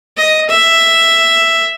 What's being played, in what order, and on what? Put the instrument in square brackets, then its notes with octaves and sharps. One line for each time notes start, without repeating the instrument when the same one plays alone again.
[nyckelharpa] D#5
E5